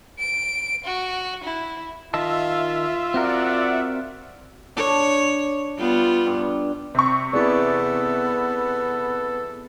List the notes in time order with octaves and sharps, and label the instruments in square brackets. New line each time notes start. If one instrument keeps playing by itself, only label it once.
[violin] D7
F#4
E4
[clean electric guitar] D#3 D#5 A5 [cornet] F4 [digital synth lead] E5
[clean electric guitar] C4 F#4 A#4 [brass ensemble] D5 F#5
[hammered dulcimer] D4 [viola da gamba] C#5
[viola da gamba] G3 B3 F4
[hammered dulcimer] G2
[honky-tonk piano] C3 C#6 [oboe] C4
[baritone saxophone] B3 [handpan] E4 G#4 D5 [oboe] A4